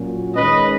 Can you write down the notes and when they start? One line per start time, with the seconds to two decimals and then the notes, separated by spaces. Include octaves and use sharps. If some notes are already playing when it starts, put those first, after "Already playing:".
Already playing: A#2 F#3 C#4
0.35 D#3 G#3 C#4 B4 D#5